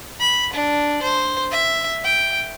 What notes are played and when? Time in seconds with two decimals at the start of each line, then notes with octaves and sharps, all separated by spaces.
0.20 B5
0.53 D4
1.02 C5
1.52 E5
2.04 G5